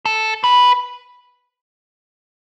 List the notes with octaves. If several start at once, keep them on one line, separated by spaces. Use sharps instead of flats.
A4
B4